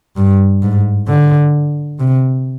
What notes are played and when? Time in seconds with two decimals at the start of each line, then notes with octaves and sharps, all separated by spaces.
0.17 G2
0.62 G#2
1.08 D3
2.00 C3